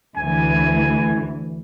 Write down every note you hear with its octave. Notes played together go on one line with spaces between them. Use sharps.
D2 E3 G#5